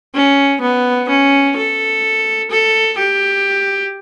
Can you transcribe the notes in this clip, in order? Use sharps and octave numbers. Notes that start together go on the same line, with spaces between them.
C#4
B3
C#4
A4
A4
G4